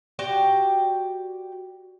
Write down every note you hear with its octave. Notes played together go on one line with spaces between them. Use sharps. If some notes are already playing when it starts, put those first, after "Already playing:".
F#4 G4 D5 G5